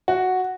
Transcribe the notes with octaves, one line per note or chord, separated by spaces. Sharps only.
F#4